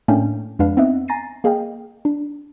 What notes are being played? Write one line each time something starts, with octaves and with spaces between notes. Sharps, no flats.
A2 A3 A#3 C#4 D4 G5
F2 G#3 D4 B4 F5
B3 C4 D#4 D#5 E5 F#5
G#5 A#5 A6 A#6 C7 D#7
A#3 G#4 D#5 F5 G5
D4